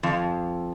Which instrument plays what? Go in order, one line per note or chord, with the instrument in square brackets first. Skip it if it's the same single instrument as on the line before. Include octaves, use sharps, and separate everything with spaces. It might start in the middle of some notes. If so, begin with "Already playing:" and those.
[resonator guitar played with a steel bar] F2